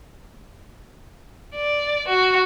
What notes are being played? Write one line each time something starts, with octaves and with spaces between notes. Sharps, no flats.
D5
F#4